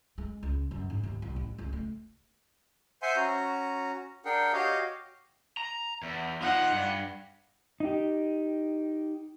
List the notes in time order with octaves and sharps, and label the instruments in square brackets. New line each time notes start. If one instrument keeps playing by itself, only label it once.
[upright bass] G#3
C#2
F#2
G#2
D#2
C2
A1
C#2
A3
[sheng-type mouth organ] C5 E5 F#5 G#5 C6
C#4 F#4 A#5
D4 G#4 A#4 F#5 G5
F#4 G4 C#5 D#5 F5
[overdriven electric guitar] A#5
E2
[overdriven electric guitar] F3 D#4 [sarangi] F#5
[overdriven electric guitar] G2
[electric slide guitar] D#4 G4